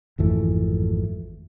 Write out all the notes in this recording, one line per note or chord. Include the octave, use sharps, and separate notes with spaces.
G#1 F2 E3 A3